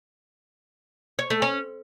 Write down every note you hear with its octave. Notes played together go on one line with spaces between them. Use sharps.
C#5
A3
C#4